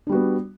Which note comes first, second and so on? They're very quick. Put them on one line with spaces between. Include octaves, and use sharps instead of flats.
D4 G3 F#4 B3